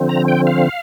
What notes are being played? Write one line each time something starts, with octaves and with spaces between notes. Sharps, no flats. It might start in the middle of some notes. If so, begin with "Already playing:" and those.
Already playing: D3 F3 C4
A#5
G5
F5